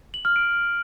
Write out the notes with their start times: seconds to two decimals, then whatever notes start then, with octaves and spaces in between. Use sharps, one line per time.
0.14 F#7
0.25 F6
0.36 D7